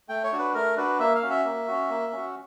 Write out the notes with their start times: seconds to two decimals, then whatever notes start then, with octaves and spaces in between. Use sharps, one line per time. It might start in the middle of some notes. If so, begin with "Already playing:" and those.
0.09 A3 G5
0.24 C#5
0.32 D4 F#4
0.39 B4
0.54 A3 A#4
0.77 D4 F#4 B4
0.99 A#3 E5
1.15 F5
1.22 C#4 F#4
1.30 E5
1.45 A#3
1.67 C#4 F#4
1.90 A#3
2.12 C#4 F#4